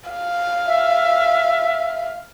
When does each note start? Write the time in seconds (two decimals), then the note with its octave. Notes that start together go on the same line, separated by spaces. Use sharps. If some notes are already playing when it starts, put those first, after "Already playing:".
0.10 F5
0.67 E5